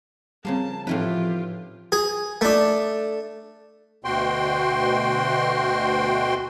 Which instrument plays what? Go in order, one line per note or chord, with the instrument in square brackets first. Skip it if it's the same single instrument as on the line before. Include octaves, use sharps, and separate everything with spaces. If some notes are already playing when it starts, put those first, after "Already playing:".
[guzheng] C#3 F3 A#3 [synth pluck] G3 C4 [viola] A5
[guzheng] A2 E3 B4 [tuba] F3 [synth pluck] C4 D#4 [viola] F4 G4
[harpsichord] G#4
A3 D4
[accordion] D2 B2 F#4 G5 C6